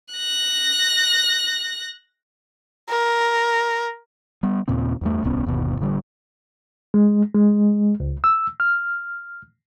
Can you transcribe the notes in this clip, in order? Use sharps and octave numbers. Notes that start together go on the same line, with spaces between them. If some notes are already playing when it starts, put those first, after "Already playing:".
F#6 A#6
A#4
G3 B3
D#2 A#2 C#3 C4
E2 G2 A3
D1 C2 B3 C#4
G1 D#2 B2
A1 D3 G3
G#3
G#3
C#2
E6
F6